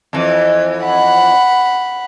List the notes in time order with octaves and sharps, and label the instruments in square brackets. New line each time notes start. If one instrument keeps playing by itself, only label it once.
[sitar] F2 E3
[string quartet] F#5 B5